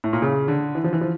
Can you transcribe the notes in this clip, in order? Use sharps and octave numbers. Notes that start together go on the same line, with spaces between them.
A2
A#2
C#3
D3
E3
F3
E3
F3